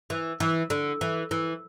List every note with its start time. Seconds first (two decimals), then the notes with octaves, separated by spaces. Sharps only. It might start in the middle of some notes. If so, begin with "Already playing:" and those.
0.10 E3
0.40 E3
0.70 D3
1.01 E3
1.31 E3